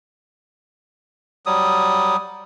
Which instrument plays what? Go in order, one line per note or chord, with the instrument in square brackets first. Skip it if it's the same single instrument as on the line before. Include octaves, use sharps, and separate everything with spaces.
[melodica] F#3 G3 D#6